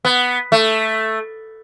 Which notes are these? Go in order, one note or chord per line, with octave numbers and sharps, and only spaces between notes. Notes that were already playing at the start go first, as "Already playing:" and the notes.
B3
A3